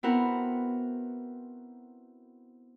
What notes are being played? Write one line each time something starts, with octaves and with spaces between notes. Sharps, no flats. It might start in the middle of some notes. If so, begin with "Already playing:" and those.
B3 C4 E4 F#4 A#4 F#5